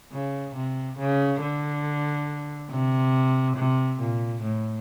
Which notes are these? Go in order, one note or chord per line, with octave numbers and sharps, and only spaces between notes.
C#3
C3
C#3
D3
C3
C3
A#2
A2